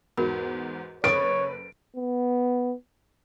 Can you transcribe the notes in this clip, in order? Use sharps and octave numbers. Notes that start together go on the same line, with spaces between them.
E2 G#2 F#4 A#4 B5
F#1 A4 B4 C#5 D6 A6 D7
B3